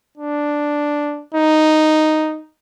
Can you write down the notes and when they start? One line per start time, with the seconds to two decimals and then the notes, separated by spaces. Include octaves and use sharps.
0.18 D4
1.35 D#4